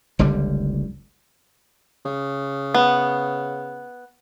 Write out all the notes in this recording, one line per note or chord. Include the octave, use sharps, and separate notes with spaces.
F#1 C#2 D3 G3
C#3
B3